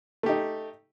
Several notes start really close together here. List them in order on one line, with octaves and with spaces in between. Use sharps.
A3 G4 D#4